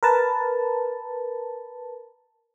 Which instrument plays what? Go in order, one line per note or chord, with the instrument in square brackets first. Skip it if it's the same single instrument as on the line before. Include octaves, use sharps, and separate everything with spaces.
[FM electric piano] A#4 B4 A5